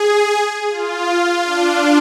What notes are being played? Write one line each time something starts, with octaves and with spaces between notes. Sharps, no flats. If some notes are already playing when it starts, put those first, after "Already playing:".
Already playing: G#4
F4
D4